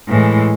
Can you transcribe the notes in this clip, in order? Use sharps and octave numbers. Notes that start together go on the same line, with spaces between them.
A2 E3 G#3